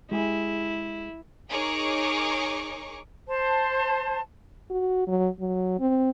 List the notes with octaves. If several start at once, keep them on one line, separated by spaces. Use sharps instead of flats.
G#3 E4 G4 G#4
D#4 G#4 A#4 C#5 C#6 D6
C5 A5
F#4
F#3
F#3
C4